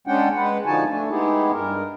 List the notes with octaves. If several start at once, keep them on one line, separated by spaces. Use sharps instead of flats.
G#3 C#4 D4 F#5 G5
G#3 B4 F#5
D3 F3 D#4 F#4 G#5 A5
A3 D4
G#3 B3 D#4 E4 G4 G#4
G2 A#4